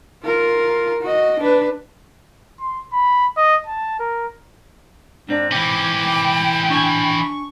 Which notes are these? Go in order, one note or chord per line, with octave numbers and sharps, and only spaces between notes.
F4 A#4
F#4 D#5
D4 B4
C6
B5
D#5
A5
A#4
G#2 C4 D4
E3 C#4 G5 D6
D4 G#5 C#6